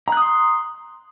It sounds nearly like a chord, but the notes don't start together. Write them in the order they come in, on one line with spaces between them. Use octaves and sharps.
A#5 F#6 D#6 C6